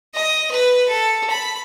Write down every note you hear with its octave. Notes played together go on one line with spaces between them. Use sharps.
D#5
B4
A4
B5